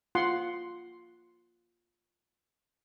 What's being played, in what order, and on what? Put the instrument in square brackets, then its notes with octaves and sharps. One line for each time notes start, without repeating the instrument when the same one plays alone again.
[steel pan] F4 F#5 C6